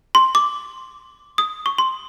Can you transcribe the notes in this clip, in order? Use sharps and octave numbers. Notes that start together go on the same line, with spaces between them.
C6
D6
D#6
C#6
C6